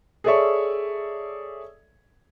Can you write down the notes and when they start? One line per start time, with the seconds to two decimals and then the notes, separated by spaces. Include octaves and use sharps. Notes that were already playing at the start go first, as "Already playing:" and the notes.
0.24 G#4 A4 C#5 D5 E5 C#6